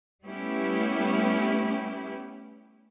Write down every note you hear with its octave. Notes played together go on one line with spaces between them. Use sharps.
G3 A3 B3 C#4 E4 G4